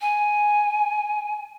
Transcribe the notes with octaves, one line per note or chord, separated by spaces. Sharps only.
G#5